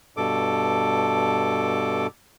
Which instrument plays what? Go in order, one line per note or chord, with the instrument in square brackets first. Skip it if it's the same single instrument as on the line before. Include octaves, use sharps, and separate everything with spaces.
[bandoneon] G2 B2 A4 D6